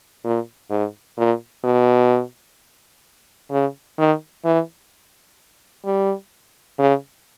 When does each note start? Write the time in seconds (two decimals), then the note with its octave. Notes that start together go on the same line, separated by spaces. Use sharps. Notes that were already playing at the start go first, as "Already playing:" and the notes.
0.24 A#2
0.70 G#2
1.18 A#2
1.64 B2
3.51 C#3
3.99 D#3
4.45 E3
5.85 G3
6.79 C#3